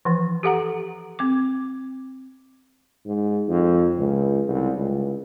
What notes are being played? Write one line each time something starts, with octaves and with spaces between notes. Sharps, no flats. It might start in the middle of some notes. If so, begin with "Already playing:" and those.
E3 F3
G4 A4 F#5 A#5
C4 D6
G#2
F2
C#2
C2
C#2